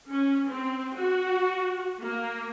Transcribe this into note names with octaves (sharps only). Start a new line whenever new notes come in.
C#4
C4
F#4
A#3